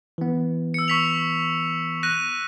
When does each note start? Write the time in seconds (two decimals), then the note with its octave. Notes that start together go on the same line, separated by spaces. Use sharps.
0.18 E3 B3
0.74 E6 C#7
0.88 C#6 B6 F7
2.03 F#6 A#6 D#7